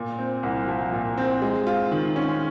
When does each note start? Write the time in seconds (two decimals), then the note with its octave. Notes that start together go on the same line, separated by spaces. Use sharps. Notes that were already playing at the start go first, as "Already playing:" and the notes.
Already playing: A#2
0.19 C4
0.43 C2
0.68 F3
0.92 A#2
1.18 C4
1.42 G#3
1.67 F4
1.91 D#3
2.16 C#4